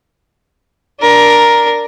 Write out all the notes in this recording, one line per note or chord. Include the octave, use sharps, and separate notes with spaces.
D4 A#4